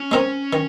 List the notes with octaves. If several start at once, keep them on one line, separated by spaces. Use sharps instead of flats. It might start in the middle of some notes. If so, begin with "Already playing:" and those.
Already playing: C#4
G#3 C4 D#4 A#4
D#3